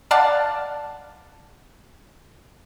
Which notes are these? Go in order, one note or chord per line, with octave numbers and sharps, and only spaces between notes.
D5 F5 F#5 A5